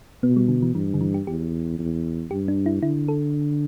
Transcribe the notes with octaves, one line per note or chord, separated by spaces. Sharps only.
B2 B3
G3
D3
E3
G2 E3
D3
E3
G4
E2 G4
E2
G2 G4
D4
E4
D3 E4
A4